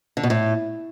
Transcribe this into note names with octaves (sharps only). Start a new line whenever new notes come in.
D3
B2
A2